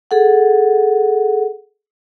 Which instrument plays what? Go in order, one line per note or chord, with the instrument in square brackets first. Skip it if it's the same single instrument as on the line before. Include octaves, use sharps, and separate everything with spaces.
[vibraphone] G#4 A4 F#5